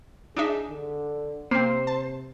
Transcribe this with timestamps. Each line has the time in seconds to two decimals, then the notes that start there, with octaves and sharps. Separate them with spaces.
0.37 D4 D#4 G#4 E5
0.70 D3
1.51 C3 A#3 C4 C5
1.87 A5